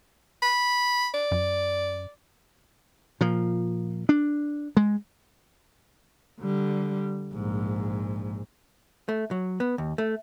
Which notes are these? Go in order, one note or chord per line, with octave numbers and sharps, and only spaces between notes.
B5
D5
F#2
A#2 F3
D4
G#3
D3 G3
A#1 G#2
A3
F#3
B3
D#2
A3